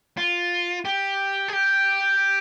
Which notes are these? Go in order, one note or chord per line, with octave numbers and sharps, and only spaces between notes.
F4
G4
G#4
G4